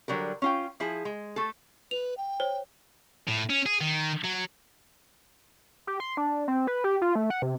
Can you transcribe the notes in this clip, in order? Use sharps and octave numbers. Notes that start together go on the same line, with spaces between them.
D3 F#3 G3 A#4
C#4 F4 G5
F3 E4 G#4
G#3
A3 A4
B4 F7
G5
C5 C#5
A2
C#4
G#4
D#3
F#3
G4
C6
D4
C4
B4
G4
F4
A3
F#5
C3